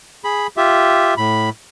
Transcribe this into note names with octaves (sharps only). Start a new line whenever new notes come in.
G#4 B5
F4 G4 E5
A2 B5